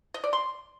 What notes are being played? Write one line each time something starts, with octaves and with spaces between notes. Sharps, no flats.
D#5
D5
C6